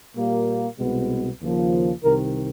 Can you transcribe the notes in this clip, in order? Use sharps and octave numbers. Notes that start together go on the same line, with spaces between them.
A#2 G3 A#3
C2 B2 G#3 B3
D#2 C#3 F3 A#3
C2 C3 D#3 A#4